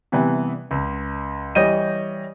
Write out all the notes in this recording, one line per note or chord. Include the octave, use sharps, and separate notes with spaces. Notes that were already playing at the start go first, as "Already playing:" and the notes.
C3 E3 G3 B3
C#2
E3 G3 C#5 D#5 G6 D#7